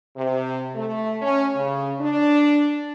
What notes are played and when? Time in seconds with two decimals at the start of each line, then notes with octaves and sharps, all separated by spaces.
0.16 C3
0.75 A3
1.22 C#4
1.55 C#3
2.00 D4